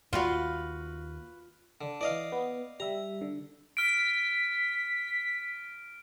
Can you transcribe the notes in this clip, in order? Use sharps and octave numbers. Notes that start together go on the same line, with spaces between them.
D#2 F4 F#4 B4 F5
D3
E3 D5 D#5 F5
B3
G3 E5 A#5
D3
F6 B6 D7